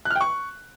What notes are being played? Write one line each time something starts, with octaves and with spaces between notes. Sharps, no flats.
F#6
F6
G5
C#6